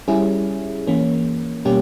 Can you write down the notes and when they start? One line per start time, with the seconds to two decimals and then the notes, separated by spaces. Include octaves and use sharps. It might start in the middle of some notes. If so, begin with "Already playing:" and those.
0.08 G3 C#4 E4 G#4
0.87 E3 A#3 C#4
1.65 B2 G3 A#3 C#4 G4